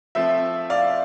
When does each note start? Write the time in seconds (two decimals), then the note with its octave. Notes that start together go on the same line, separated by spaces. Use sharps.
0.15 F3 A3 C4 E5
0.70 D5 F5